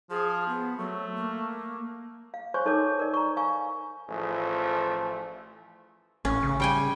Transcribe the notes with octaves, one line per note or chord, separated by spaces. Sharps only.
F3 G#4
B3
F#3 A3
A#3
F5
C5 C#5 G#5 C6 C#6
D#4 A4 A#4 C#5 D6
A#4 D5
A#5 C#6
F5 G#5 C#6
A1 F3 A3 G#4
A1 C#4
C#3
G3 G5 G#5